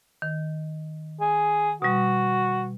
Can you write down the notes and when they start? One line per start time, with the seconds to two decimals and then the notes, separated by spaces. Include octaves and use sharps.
0.22 D#3
1.21 G#4
1.82 B2 G3 F#4